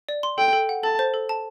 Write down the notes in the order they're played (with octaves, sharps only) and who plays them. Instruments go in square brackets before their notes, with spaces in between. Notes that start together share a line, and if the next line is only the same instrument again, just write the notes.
[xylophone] D5
C6
[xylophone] A4 [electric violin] G5
[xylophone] A4
F#5
[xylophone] A4 [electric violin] A5
[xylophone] C5
A4
A5